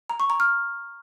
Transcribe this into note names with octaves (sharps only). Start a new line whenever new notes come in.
A#5
C#6
A#5
F6